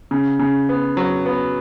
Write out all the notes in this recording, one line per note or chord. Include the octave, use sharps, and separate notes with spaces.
C#3
C#3
B3
F#3
B3